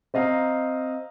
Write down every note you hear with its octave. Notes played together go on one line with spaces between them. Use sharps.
C4 D#5 F5 A#5